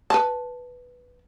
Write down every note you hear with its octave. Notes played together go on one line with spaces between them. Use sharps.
B4 A5